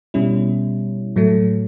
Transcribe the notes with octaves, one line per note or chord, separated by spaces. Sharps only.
B2 G3 C#4 E4
A2 F#3 A3